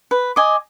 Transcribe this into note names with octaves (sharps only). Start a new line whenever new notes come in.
B4
D#5 G#5 D6